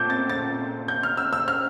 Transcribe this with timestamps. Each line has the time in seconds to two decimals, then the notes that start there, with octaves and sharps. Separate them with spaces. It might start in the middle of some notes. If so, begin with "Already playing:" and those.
Already playing: A#2 A3 C4 D6 G6
0.10 A6
0.30 A6
0.88 G6
1.03 F6
1.17 E6
1.33 E6
1.48 F6